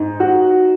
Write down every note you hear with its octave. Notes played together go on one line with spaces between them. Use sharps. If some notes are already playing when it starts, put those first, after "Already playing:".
Already playing: G#2 D#4
F#4